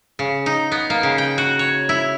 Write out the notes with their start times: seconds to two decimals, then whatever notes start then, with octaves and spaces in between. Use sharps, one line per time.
0.19 C#3
0.46 D#4
0.72 B3
0.90 A#3
1.03 C#3
1.18 G5
1.38 F#4
1.59 C#5
1.89 E4